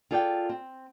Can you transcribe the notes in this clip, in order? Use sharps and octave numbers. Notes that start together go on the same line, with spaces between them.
F4 G#4 A4 D5 F5 G5
C4